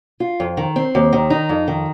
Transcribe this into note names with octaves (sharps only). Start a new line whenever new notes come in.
F4
F2
D#3
C4
D#2
D#3
D#4
F2
D#3